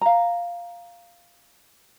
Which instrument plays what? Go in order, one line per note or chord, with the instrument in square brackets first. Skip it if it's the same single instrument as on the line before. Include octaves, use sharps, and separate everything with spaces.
[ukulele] F5 A#5